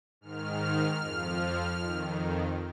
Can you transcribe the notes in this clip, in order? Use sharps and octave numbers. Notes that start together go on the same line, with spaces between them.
G#2 D#3 F6
F2 F3
F2 D#3